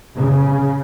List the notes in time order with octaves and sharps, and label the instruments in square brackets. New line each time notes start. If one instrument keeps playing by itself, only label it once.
[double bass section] C#3